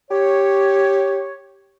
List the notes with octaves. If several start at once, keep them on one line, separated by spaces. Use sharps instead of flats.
G4 C#5